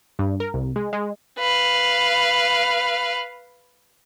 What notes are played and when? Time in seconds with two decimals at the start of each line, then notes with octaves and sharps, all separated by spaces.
0.19 G2
0.40 A#4
0.54 C2
0.76 G#3
0.93 G#3
1.39 B4 F5